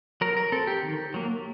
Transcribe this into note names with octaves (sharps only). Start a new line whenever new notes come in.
F#3 A#4
A#4
C4 A4
G4
D#3
F#3 A#3